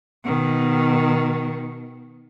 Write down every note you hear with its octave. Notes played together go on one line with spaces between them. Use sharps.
B2 D#3